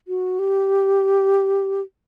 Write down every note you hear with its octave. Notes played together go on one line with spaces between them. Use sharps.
F#4
G4